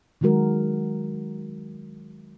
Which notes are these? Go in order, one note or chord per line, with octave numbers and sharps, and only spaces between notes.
D#3 F#3 G#3 F#4 A#4